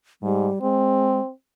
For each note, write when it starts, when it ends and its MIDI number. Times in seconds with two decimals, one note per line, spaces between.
0.22 0.49 44
0.22 0.59 55
0.62 1.20 56
0.62 1.31 60